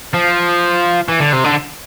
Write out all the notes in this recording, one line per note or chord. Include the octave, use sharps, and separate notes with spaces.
F3
E3
D3
C3
D3